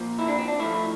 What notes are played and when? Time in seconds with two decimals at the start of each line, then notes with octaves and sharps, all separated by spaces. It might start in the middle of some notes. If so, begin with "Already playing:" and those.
Already playing: A#2 F3
0.19 E4
0.28 D4
0.38 C4
0.48 D4
0.59 A2 F3 E4